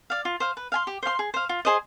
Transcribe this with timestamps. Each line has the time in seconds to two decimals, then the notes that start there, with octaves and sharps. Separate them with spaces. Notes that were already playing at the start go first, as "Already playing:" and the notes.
0.10 D5 F5
0.25 F4
0.40 C5 F5
0.57 B4
0.72 F5 G#5 C6
0.87 G4
1.03 C5 F5 C6
1.19 G#4
1.34 C5 F5
1.49 F4
1.65 G#4 C5 D#5